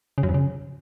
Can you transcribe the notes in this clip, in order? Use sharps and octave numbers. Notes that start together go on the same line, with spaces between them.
C#3
F#2
F2
C#3